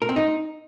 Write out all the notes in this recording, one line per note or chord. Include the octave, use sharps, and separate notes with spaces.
A#4
C4
D#4